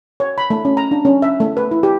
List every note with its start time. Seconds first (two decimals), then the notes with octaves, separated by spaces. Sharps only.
0.20 C#5
0.38 B5
0.50 A3
0.65 C#4
0.77 A#5
0.91 D4
1.05 C#4
1.22 E5
1.40 A3
1.57 B4
1.71 E4
1.83 G4